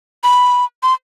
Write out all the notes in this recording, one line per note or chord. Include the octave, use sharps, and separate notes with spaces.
B5
C6